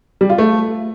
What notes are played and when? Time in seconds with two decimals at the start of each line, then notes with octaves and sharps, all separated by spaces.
0.21 G3
0.30 F4
0.38 A3